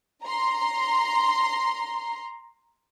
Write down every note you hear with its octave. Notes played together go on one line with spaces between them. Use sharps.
A#5 C6